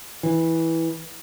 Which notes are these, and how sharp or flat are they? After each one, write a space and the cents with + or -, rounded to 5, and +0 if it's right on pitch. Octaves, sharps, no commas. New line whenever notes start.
E3 -10